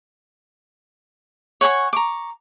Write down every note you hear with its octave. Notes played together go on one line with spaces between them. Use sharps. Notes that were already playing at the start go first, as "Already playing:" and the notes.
C#5 F#5 G#5 C#6
A#5 C#6 D6